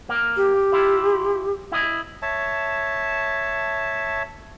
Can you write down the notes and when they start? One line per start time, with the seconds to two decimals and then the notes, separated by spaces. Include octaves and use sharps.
0.09 A#3
0.37 G4
0.72 E4 F4
1.72 E4 D#5
2.22 C#5 E5 A5